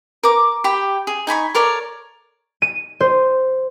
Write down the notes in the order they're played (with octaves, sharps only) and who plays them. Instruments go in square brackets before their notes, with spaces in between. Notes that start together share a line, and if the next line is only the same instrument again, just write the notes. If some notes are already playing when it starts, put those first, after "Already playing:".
[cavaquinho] A#4 D6
G4 G5 B5
G#4
D#4 G#5 B5 C#6
A4 A#4 C#5 D5
[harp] D#7
C5